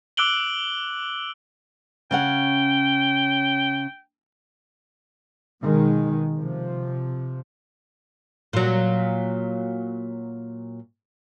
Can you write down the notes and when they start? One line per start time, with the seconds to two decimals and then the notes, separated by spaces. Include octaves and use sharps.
0.17 D6 E6 F#6 D7 F#7 G7
2.11 C#3 C#4 F#5 G5
5.62 B2 D#3 G#3
6.37 C3 F3
8.53 A#2 F#3